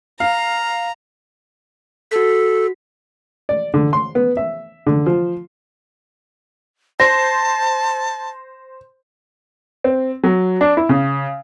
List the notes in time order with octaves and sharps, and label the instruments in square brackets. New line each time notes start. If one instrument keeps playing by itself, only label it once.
[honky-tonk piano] F5 [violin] A#5
[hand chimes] F#4 B6 [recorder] A4
[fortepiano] D5
D3
C6
B3
E5
D3
F3
[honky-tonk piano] C5 [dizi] A5 [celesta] A#6
[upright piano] C4
F#3
D4
E4
C#3